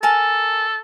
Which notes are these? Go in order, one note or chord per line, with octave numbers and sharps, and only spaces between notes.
A4 A#4 G#5 A5